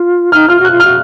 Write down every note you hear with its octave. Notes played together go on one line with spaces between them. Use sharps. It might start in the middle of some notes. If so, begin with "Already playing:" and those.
Already playing: F4
D#4 F6
F4 F6
F#4 F#6
F4
F#4 F6